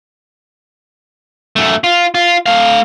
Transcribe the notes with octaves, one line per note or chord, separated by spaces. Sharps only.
F#2 A3
F4
F4
A3 F5